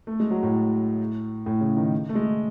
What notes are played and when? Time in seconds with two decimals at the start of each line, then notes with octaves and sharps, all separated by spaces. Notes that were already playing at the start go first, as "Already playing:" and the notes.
0.07 A3
0.20 G#3
0.31 F#3
0.43 A2
1.46 A2
1.61 C#3
1.77 D#3
2.09 A3
2.15 G#3